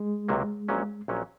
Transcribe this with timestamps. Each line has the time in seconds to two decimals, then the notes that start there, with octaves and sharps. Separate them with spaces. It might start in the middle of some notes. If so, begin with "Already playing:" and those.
Already playing: G#3
0.28 C#2 C3 F#3 A#3
0.68 A#1 A#2 F#3 C#4
1.08 A#1 A#2 F#3 C#4